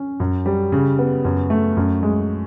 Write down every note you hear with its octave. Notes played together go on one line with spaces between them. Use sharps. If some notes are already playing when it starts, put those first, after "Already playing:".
Already playing: C#4
F#2
G3
C#3
B3
F#2
A3
F#2
G#3